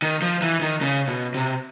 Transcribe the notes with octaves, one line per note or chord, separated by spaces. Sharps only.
D#3
F3
E3
D#3
C#3
B2
C3